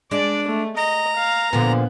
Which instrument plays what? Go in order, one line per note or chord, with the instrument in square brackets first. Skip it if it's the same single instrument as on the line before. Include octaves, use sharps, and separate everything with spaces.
[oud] G#3 [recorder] D4 [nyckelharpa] D5
[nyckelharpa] A3
[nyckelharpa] D#5 [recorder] A#5
[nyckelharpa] F5
[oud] A#2 D3 F3 [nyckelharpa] B3